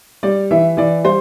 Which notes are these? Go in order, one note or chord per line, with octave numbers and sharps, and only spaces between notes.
G3 D5
E3 E5
E3 D5
G3 C5